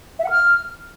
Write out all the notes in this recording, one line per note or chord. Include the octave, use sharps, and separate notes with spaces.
E5
F#5
F6